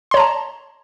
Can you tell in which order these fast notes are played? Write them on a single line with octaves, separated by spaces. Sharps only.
C6 C#5 A#5 A5